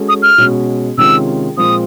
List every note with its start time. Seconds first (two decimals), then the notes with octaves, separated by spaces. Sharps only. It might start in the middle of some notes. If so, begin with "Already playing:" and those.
Already playing: G#3 C#4 F#4 A4 C#5
0.09 D#6
0.22 F6
0.38 B2 G#3 C#4 F#4
0.98 C3 D#3 G#3 C#4 F4 E6
1.57 A#2 F3 G#3 C4 F4 D#6